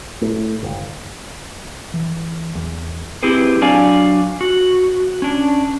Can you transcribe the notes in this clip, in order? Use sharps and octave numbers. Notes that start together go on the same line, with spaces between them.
A2
G1
E3
E2
C4 E4 G4 G#4 B4
F#3 D4 D5 F5 G#5
F#4
C#4 D4